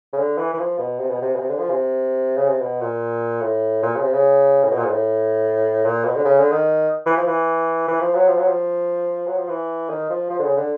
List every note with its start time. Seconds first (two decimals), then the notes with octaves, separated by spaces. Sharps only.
0.13 C#3
0.18 D3
0.38 E3
0.53 E3
0.59 F3
0.78 B2
1.00 C3
1.10 B2
1.22 C3
1.35 B2
1.39 C3
1.50 D3
1.59 F3
1.70 C3
2.37 C#3
2.48 C3
2.61 B2
2.81 A#2
3.42 A2
3.82 A#2
3.96 C#3
4.02 C3
4.13 C#3
4.64 A2
4.71 B2
4.77 A#2
4.85 G#2
4.91 A2
5.85 A#2
6.04 B2
6.16 D3
6.25 C#3
6.39 D3
6.52 D#3
7.06 E3
7.17 F3
7.27 E3
7.88 E3
8.01 F3
8.15 F#3
8.28 F3
8.38 F#3
8.48 F3
9.27 F#3
9.38 F3
9.49 E3
9.90 D#3
10.10 F3
10.30 F3
10.39 D3
10.44 C#3
10.57 D3